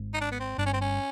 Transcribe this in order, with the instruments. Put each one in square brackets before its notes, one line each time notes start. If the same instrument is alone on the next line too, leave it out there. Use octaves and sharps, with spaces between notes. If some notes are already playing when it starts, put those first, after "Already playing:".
Already playing: [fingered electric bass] G#1 G#2
[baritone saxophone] D#4
D4
B3
C4
[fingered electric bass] G1 G2 [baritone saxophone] D4
[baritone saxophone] C#4
C4
C#4